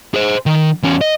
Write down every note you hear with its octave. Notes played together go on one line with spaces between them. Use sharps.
G#4 C5
D#3
E2 C#4
D#5